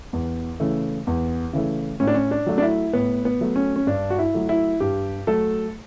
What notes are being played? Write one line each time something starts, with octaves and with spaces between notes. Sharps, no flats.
E2
C#3 E3 A3
E2
C#3 E3 A3
A2 C#4
D4
C#4
D4
F#3 A3
D4
E4
A2 B3
B3
F#3 A3
C#4
C#4
G2 D4
F#4
E4
F#3 A3
E4
G2 G4
F#3 A3 A4